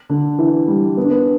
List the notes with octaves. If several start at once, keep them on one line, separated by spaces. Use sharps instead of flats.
D3
E3
G3
B3
D4
B3